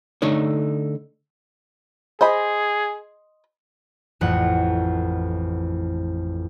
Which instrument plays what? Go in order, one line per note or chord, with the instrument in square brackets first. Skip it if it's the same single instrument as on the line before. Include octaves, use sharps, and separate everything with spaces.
[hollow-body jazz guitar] D3 A3 D#4 C#5
[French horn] G#4 [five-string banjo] C5 D#5 B5
[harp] A1 F2 F#5